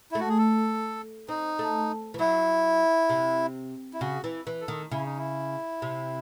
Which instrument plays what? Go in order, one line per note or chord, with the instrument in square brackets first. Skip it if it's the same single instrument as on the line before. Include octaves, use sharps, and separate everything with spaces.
[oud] A3 [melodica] E4
[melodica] F#4
G#4
A4
[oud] C4 [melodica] D#4
[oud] A3
E3
[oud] F#3 [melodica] E4
[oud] C3
[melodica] E4
[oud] C#3 [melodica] F#4
[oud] E3
E3
[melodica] A4
[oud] D#3
[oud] C#3 [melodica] E4
[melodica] D#4
E4
[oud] C3